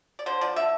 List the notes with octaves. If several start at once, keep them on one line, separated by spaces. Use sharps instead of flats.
D5
D3 C5
F3 D5
D3 E5